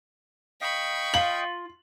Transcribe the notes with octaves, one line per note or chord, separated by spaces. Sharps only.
D#5 F5 G5 B5 C#6
F4 F#7